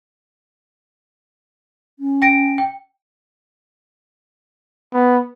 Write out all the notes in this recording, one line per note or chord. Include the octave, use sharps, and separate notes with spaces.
C#4
G5 A#6 D7
G5
B3